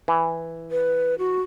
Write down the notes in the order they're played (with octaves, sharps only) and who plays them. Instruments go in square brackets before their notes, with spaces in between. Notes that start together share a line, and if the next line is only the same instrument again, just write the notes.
[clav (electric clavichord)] E3
[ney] B4
F#4